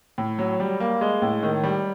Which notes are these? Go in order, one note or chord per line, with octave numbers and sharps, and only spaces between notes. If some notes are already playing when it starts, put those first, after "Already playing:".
A2
F#3
G3
A#3
G#3
A2
D#3
G3